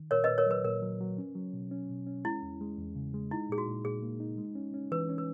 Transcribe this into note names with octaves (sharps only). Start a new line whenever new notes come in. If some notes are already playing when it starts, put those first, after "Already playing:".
Already playing: D#3
A#2 A#4 C#5
B4 D#5
A#2
A#4 C#5
F#3 B4
A#2 A#4
F#3
F#3
C#4
F#3
B2
C#4
B2
C#4
G#3 E4
E2
G#3
E2
C#3
G#3
D#4 E4
A#2 G#4
F#4
A#2
A#2 G#4
A#3
D#4
G#3
C#4
C#4
E3 B4
C#4
B4